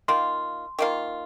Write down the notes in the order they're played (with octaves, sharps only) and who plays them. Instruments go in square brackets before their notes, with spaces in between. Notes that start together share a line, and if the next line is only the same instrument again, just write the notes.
[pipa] D#3 A#3 F4 [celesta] C6
[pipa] D#3 A#3 F4